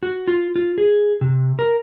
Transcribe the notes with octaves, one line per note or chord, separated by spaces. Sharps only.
F#4
F4
F4
G#4
C3
A#4